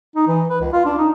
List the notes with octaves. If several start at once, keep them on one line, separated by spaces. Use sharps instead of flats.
D#4
E3
B4
C#2
F4
D4
D#4